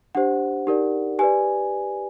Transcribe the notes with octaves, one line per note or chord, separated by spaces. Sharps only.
D4 G4 C5 F#5
D#4 G4 A#4 D5
G4 B4 D5 G#5